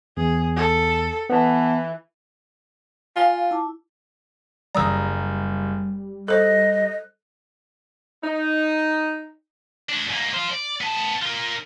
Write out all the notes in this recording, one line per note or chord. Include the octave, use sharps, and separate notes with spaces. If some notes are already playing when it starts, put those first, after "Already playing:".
E2 G#4
A4
E3 B3 A5
F4 F5 G#5
E4 A5 D6
F#1 G3 D5 A#5 D#6 E6
A4 C5 D#5 F#6
D#4
D4 F#4
G#2 A#3
C5 F5
D5
B3 A5
F4 A#4